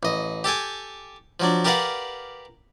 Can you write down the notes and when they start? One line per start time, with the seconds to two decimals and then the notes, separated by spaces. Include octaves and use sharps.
0.03 A1 D#5
0.44 G4 A4 G5 G#5
1.40 F3 F#3 D4
1.65 G4 A#4 B4 D5 F5 F#5